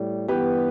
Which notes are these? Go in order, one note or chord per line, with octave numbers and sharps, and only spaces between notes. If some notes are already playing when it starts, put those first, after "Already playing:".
Already playing: A2 G3
G2 E3 B3 G4 B4